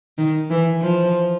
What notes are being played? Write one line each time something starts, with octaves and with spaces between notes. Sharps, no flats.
D#3
E3
F3